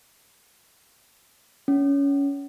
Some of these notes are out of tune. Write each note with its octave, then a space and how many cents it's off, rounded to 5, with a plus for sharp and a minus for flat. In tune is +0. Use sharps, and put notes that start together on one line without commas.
C#4 +20